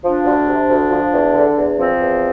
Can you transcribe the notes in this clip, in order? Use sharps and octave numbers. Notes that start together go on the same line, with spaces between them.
F3 D4
D2
C3
D2
F3
E2
D3
E2
F3 C4
E2